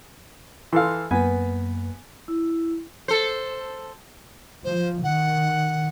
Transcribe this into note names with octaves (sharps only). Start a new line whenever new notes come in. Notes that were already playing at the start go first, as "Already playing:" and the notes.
E3 A4 F5 C6
F#2 A#3 B3 B4 G#5
E4
A4 C5
F3 C5
D#3 F#5